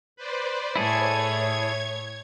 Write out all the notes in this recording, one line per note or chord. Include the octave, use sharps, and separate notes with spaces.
B4 C5 D5
A2 E4 G#4 A4 C#5 G#6